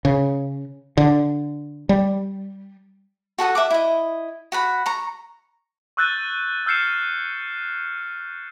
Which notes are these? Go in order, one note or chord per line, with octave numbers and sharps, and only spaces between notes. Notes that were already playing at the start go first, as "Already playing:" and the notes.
C#3
D3
G3
F#4 A4 F#5 D#6
E5 F#5 D6
E4 D#5
F#4 F#5 B5
A#5 C#6
C#6 E6 F#6 G6 A6 D#7
E6 F6 G6 C7 C#7 E7